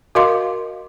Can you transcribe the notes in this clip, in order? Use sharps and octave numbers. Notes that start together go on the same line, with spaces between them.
F#4 A#4 D#5 F5 C6 D6